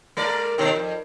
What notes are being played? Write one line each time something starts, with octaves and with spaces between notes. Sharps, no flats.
G#3 A#4 D5
B2 D#3
F2